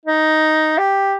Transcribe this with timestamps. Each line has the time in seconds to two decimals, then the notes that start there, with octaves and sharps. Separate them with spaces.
0.05 D#4
0.78 G4